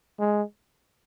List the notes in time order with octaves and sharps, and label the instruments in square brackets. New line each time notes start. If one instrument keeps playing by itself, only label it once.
[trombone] G#3